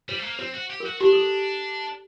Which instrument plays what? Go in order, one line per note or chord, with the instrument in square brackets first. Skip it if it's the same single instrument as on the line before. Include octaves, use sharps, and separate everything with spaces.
[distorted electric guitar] G3 [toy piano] C5
[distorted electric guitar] A3
A#3
[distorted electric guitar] C4 [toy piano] C5
[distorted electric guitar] F#4
G4
[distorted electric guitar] F#4 [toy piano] A#4
[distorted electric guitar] D4 [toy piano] G4
[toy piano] A4